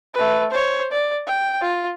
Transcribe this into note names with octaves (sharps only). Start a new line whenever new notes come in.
A3 B4
C5 C#5
D5
G5
F4